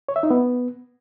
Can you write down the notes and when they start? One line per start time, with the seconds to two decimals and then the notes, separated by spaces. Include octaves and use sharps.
0.09 C#5
0.16 E5
0.23 D#4
0.31 B3